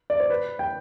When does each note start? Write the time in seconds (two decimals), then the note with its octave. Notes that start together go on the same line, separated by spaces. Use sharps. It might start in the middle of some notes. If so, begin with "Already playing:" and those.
0.10 D5
0.20 C5
0.30 B4
0.59 G5